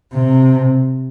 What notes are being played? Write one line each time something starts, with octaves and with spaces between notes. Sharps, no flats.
C3